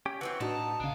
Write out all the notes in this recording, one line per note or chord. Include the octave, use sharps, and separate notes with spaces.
C#4 G4 G5
E3 F#3 C4 F#5
A2 D4 D#4 F#4 A5
A#1 C#3 D4 F5